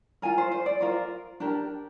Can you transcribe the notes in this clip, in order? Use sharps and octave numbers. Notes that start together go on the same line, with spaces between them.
F4 A#4 G#5
C5
C5
D5
F4 A#4 C5
D4 G4 A#4